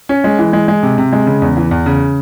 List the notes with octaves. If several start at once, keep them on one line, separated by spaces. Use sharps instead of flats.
C#4
G#3
E3
G#3
G#3
C3
C3
G#3
C#3
E2
E3
E2
C#3